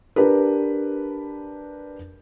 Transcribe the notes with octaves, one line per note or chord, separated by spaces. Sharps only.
D4 G4 A#4 B4